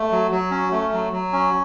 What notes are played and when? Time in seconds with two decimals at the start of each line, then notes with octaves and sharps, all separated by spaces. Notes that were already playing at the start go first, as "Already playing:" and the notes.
Already playing: A3
0.11 F#3
0.31 F#3
0.51 C#4
0.71 A3
0.92 F#3
1.12 F#3
1.33 C#4